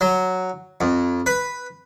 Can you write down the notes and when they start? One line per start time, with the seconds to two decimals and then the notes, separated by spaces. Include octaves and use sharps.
0.01 F#3
0.81 F2
1.26 B4